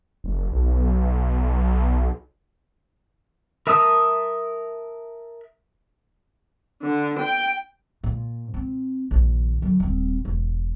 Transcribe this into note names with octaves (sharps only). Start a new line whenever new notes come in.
F#1
B1
A#4 E5 A5 D#6 E6
D3
G5
A#2
C4
A#1 D#3
D3 F#3
D#1 C4
E1